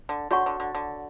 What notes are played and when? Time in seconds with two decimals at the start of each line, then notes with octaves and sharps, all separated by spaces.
0.09 D3
0.31 D3 F#4 C#5 F#5 C#6
0.46 D3
0.60 D3
0.75 D3